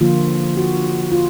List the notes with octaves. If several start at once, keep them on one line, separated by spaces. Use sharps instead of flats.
D3 F3 A#3 F4
F#4
F4